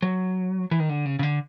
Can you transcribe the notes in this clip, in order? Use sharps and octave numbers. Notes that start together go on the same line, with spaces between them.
F#3
E3
D#3
D3
C#3
C#3
D3